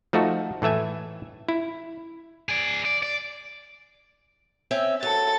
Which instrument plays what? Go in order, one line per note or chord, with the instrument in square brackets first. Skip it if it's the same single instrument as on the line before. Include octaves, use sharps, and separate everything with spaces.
[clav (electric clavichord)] F3 A3 D#4 F#4 A4
A2 E3 A3 E5 G#5
E4
[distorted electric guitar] G#4 D5
D5
D5
[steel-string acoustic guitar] C4 C#4 E5
[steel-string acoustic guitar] F#3 [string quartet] A4 A6